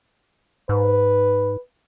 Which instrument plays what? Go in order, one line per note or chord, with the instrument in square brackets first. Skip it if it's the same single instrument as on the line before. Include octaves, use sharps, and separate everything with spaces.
[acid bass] G#2 [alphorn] B4